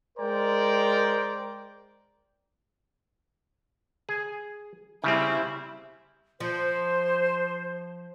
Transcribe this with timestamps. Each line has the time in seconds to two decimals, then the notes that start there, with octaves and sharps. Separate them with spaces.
0.18 G#3 A#4 C5 D5 G5 A#5
4.09 G#4
5.04 C#3 G3 C4 E4
6.40 F3 C5